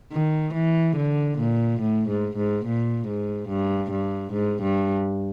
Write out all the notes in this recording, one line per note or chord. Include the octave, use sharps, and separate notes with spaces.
D#3
E3
D3
A#2
A2
G#2
G#2
A#2
G#2
G2
G2
G#2
G2